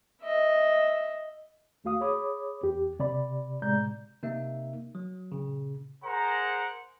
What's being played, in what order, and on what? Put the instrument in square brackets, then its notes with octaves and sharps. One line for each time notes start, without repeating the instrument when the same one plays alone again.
[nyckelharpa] D#5 E5
[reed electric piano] D#2 A3 F#4 F5 D#6
G#4 C#5 B5 D6 D#6
E2 G4
C3 D5 B5
A2 C3 G#3 D5 A#5 G6
[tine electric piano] C3 A#3 D#4 E5
F#3
A#2 C#3
[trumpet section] G#4 A#4 C5 F#5 A#5